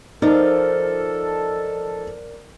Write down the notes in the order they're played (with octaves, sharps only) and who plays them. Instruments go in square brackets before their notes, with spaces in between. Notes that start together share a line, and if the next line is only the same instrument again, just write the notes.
[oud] F3 [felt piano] D#4 [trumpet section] A4 [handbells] A#4 D5